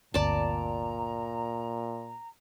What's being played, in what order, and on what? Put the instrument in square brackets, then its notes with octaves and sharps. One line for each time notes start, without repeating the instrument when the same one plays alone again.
[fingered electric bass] G1 D2 C4 [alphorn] A#2 [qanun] D5 A5 [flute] A#5